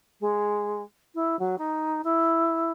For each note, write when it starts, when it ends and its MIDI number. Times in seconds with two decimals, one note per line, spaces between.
0.20 0.82 56
1.15 1.38 64
1.39 1.55 54
1.58 2.01 63
2.04 2.72 64